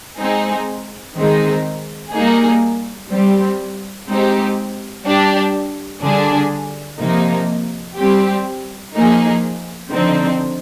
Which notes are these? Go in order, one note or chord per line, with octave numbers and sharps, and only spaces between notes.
G#3 C4 D#4 G#4
D#3 G#3 C4 D#4
G3 A#3 D#4 G#4
G3 C4 G4
G#3 C4 D#4 G4
G3 D4 G4
D3 G3 D4 G#4
C3 F3 A#3 D#4
G3 C4 G4
F3 A#3 D#4 G#4
D3 F3 C4 D#4